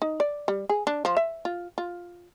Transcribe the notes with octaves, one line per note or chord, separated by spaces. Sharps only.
D#4
D5
G3
G#4
D4
F3
E5
F4
F4